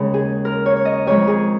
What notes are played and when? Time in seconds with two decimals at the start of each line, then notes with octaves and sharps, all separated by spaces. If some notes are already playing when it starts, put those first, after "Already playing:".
Already playing: D#2 C#3 G#3 D#4
0.14 G#4
0.45 A#4
0.66 C#5
0.77 C#5
0.85 D#5
1.07 F2 D#3 G#3 C#5
1.27 G#4